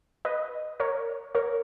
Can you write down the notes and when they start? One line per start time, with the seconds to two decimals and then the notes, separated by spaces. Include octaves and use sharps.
0.25 B4 D#5
0.80 A#4 C#5
1.35 A#4 C#5